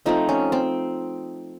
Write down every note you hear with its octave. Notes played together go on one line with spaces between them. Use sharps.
F3 A3 C4 D#4
C#4
C4